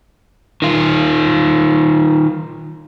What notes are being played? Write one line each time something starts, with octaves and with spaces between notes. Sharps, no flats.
D#3 F4